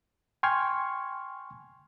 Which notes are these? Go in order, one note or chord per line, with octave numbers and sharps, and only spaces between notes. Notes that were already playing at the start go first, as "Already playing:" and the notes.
G5 G#5 C6 C#6 F6 G#6